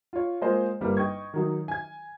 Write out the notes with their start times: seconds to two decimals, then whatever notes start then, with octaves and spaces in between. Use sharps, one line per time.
0.13 F4 C#5
0.42 G#3 A#3 F4 C5 D#5
0.81 G1 G3 A#3
0.97 D#5 G5 C#6 G#6
1.34 D#3 F#3 D#4
1.68 G#5 G#6